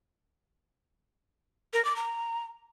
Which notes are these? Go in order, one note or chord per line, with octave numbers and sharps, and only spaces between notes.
A#4
D6
A#5